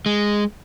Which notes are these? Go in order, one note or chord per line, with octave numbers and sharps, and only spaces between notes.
G#3